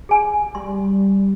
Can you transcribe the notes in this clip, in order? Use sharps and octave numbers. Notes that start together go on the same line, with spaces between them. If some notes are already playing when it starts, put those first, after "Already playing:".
G#4 G#5
G3 C6